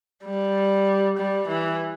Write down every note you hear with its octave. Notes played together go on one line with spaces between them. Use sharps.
G3
G3
E3